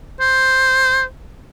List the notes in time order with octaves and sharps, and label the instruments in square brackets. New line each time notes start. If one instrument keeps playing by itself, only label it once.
[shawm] C5